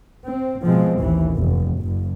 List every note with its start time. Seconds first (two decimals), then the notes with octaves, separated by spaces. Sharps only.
0.27 C4
0.65 B2 F3 G#3 C4
1.00 A1 D#2 E3
1.35 F1
1.81 F#1